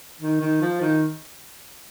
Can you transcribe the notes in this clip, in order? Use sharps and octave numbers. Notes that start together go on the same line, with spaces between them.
D#3
D#3
F3
D#3